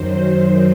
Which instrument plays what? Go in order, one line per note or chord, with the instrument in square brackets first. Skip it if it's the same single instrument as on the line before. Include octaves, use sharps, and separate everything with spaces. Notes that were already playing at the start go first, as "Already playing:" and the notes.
Already playing: [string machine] F#2 D#3 F#3 C5
C5